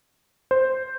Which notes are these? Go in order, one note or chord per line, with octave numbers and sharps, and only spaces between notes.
C5